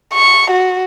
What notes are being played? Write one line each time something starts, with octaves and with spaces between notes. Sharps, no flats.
C#6
F#4